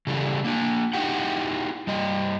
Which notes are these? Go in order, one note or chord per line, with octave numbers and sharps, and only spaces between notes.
C#3 E3 G3 A4
A#3 D4
D#4 E4 G4 F#5 G5
G2 G3 D#5